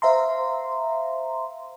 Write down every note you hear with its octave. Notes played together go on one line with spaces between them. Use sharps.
C5 E5 F5 A#5 C6